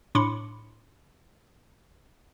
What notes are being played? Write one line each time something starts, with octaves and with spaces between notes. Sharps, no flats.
A2 D4 B5 C6 D6 C#7